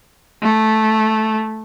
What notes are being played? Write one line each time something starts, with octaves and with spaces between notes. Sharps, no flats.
A3